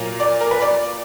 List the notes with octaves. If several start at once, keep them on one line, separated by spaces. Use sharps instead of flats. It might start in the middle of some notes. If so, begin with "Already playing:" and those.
Already playing: A#2 F#3 A#3 F4
D5
A#4
B4
D5